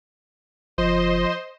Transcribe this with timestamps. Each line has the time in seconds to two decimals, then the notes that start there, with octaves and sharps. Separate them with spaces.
0.78 F#1 F3 C5 D#5 C6